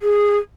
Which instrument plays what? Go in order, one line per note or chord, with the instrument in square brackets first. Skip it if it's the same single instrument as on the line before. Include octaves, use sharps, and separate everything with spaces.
[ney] G#4